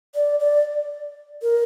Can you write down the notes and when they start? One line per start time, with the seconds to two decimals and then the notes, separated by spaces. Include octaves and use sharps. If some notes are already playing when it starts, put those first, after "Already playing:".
0.15 D5
0.40 D5
1.42 A#4